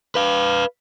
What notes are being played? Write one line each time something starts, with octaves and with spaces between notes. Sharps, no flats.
B4 F5